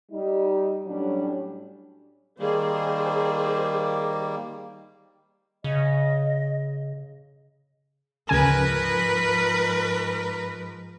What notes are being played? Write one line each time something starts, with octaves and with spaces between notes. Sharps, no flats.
G3 D#4
A2 F#3 G3 C#4 D4
D#3 G3 A#3 G#4 C5
C#3 D#5
D2 G#2 C#3 F3 A#4 B4 G#5